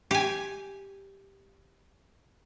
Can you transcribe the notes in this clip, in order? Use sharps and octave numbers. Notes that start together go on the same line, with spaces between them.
G4 G#5